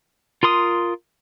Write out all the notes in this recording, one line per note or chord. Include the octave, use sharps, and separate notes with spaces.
F4 A#4 C6 D#6